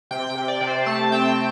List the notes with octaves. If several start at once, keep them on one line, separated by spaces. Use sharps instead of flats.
C3 G5
G5
C3
D5
C3
C5
A3 A5
C4 G5